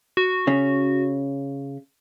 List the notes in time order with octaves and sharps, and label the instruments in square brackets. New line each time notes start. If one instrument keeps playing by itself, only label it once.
[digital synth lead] F#4
[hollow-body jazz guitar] C#3 C#4